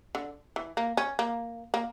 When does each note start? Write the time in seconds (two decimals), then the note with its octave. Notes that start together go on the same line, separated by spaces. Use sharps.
0.15 D3
0.56 E3
0.77 A#3
0.97 C#4
1.19 A#3
1.74 A#3